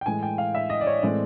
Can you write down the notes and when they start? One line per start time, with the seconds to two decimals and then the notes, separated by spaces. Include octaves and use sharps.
0.01 G5
0.06 A2 E3 G#3 G#5
0.23 G5
0.38 F5
0.55 E5
0.70 D#5
0.81 D5
0.87 C#5
1.03 A2 E3 G#3 C4 D5